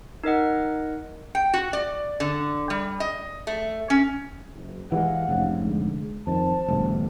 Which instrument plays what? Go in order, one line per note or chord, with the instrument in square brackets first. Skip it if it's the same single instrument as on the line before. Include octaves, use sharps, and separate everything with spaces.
[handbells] D#4 A#4 D#5 F#5
[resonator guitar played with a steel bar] G5
F#4
D5
D3
G3
D#5
A3
C#4
[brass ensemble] F#1
[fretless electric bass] E3 F3 G#3 [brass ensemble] G4 F5 F#5
[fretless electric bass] F1 G#2 C#3
[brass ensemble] D3 G#3
[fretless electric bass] F2 D#3 [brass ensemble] C5 A5
[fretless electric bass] E1 D2 G2